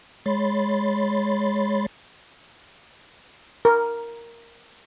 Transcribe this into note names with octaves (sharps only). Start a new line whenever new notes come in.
G#3 C#5 B5 C6 A6
A#4